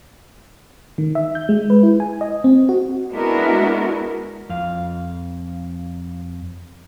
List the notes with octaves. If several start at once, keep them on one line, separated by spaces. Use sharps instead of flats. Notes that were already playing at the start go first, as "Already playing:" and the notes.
D#3
E5
G6
G#3
B4
E4
G#5
D#5
C4
F#4
G#3 B3 D4 E4 F#4 A#4
F2 F5